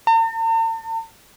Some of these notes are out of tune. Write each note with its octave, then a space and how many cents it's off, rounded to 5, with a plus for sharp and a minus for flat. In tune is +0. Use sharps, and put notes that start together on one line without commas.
A5 +45